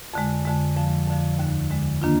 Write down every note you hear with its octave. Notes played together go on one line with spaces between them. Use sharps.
F2 D3 G#3
F2 D3 G#3
F2 D3 F3
F2 D3 F3
D#2 D3 G#3
D#2 D3 G#3
D#3 A#3 D4 F4